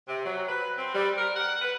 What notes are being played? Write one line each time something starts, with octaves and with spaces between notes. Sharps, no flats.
C3
F#3
B4
C4
G3
A#4
F#5
B4